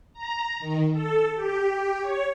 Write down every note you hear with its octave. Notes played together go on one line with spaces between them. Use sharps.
A#5
D#3
A4
G4
C#5